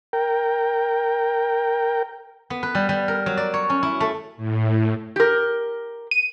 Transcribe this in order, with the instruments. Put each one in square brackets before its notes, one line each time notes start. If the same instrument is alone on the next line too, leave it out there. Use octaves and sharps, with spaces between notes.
[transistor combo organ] A#4 G5
[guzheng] B3
B4
G3
G3
A#4
F#3
D5
C#5
C#4
E4
A3
[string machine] A2
[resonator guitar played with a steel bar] G4 A#4
[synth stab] D#7